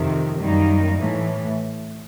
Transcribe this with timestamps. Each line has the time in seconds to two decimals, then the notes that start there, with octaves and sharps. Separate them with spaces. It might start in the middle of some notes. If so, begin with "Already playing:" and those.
Already playing: F2 C3 D#3
0.39 F#2 D#3 G3 A#3 D#4
0.99 A2 E3 A3